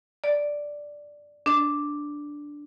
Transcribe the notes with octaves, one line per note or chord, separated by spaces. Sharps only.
D5
D4